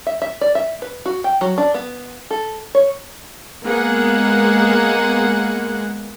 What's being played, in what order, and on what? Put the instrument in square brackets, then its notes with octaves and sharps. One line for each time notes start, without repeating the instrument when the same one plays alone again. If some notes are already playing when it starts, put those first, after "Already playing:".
[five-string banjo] E5
E5
D5
E5
B4
F#4
G5
F#3
D4
B3
A4
C#5
[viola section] G#3 A#3 B3 G#4 F#5